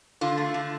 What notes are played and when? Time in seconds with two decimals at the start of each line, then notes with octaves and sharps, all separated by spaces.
0.21 D3 F4
0.37 A3
0.54 D3